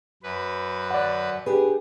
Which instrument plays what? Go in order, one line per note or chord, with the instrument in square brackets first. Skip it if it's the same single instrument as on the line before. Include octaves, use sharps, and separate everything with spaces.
[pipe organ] F#2 B4
[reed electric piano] D5 F#5
[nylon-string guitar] D4 G4 G#4 [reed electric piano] B4